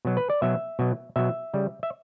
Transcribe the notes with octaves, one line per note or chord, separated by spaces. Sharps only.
B2 F#3
B4
D5
B2 F#3 E5
B2 F#3
B2 F#3 E5
C#3 G3
E5